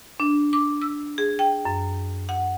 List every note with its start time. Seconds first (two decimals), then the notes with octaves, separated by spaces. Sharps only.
0.20 D4
0.53 D6
0.82 E6
1.18 G#4
1.39 G5
1.65 F#2
2.29 F#5